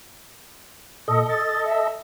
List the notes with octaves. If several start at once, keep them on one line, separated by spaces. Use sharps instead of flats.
A#2 A4 D#5
A6
E5